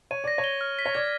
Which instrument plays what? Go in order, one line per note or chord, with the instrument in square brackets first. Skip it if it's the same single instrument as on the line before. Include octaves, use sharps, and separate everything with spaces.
[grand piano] C#5 [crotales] D#7
[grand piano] D5 [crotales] A#6
[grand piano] C#5
[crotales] G7
F6
B6
[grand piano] C#5
[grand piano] D5 [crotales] G#6